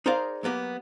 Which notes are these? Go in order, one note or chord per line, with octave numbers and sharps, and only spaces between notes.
D#4 G#4 A#4 C5 D5 F5
F#3 A#3 B3 G4